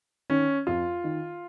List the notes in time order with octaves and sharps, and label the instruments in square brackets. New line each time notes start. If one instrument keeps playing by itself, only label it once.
[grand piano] D#3 C#4
F2 F4
D#3